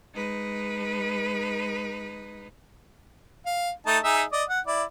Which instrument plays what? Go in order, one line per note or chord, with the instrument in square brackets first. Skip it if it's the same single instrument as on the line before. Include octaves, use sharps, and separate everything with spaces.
[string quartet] G#3 D#4 B4
[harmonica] F5
A3 D#4 A5
D#4 G#4 E5
D5 D#5
F#5
E4 D5